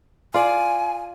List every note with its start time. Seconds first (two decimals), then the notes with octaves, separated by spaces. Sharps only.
0.34 F4 D5 G#5